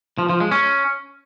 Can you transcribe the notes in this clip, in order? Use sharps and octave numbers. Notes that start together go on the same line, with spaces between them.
F3
F3
G#3
C#4